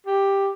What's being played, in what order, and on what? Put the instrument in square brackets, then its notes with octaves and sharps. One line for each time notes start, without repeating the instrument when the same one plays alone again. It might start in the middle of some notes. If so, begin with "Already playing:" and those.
[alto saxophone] G4